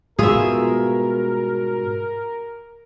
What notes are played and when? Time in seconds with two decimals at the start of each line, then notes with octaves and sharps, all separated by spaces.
0.19 G#2 B2 G3 B3 F4 G#4 A#4 E5